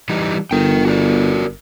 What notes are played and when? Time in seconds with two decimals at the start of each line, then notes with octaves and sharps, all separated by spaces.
0.09 E3 G3 D#4
0.51 G1 A#4 G5
0.85 F#4 A#4 D5